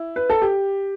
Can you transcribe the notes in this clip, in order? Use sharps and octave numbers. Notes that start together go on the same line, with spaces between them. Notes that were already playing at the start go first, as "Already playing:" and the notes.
Already playing: E4
B4
A4
G4